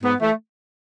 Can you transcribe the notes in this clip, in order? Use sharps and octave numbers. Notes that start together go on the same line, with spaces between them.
G#2 B3
E3 A3